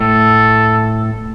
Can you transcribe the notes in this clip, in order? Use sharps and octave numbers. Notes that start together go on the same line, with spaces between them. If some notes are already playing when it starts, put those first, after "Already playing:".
A2 A4